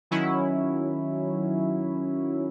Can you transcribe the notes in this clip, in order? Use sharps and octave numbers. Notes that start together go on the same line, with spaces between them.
D#3 F#3 C#4 E4